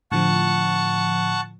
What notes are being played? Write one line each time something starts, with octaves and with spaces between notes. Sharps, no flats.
A2 D3 F3 F#5 A5 C#6